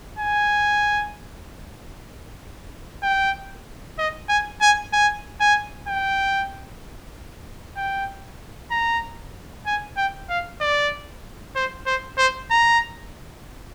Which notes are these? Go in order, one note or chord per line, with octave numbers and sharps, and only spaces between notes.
G#5
G5
D#5
G#5
G#5
G#5
G#5
G5
G5
A#5
G#5
G5
F5
D5
C5
C5
C5
A#5